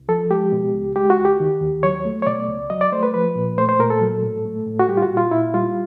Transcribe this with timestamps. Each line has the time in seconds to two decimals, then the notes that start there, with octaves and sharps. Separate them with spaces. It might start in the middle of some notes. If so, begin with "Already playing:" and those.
Already playing: C2
0.08 F3 A4
0.30 G#3 G4
0.52 B2
0.74 C#2
0.96 G#3 G4
1.10 F#4
1.18 C#2
1.25 G4
1.40 D#3
1.61 D#2
1.83 F#3 C#5
2.05 A3
2.22 C#5
2.26 B2 D5
2.48 C#2
2.70 F#3 D#5
2.81 D5
2.92 A3 C5
3.03 B4
3.14 F3 B4
3.35 A#2
3.58 A3 C5
3.69 C5
3.80 A#2 A#4
3.90 A4
4.01 F#3
4.23 A2
4.45 A3
4.67 A2
4.79 F#4
4.88 G3 G4
4.97 F4
5.02 F#4
5.10 A#2
5.17 F4
5.31 A#2 E4
5.54 G3 F4